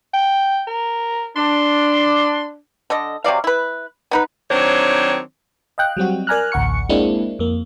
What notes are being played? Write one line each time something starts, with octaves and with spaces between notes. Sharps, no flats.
G5
A#4
D4 C6
D3 A4 D#5
C3 F#3 D5 F5
E4 B4
B3 D#4 B4
D#3 F#3 C4 D4 C5 C#5
D#5 F5 G5 F#6
F#3 G3 C4 F#4
A#4 D5 G#5 A#5 F6 F#6
A1 D2 F#5 C#6 C#7
G#3 A#3 C4 D4 E4
F2 A#3